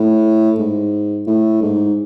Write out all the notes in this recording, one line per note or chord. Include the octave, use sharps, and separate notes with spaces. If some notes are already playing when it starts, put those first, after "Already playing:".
Already playing: A2
G#2
A2
G#2